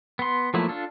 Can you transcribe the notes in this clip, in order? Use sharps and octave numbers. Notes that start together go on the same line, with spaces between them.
B3 C6
F3 F#3 A3 A#3 E4
D4 F4 A4